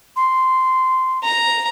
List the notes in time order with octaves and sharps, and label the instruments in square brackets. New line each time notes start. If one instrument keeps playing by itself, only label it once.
[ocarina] C6
[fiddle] A#5